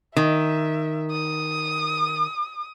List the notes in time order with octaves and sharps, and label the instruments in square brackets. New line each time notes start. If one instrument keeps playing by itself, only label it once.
[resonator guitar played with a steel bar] D#3 [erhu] E5
[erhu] D#6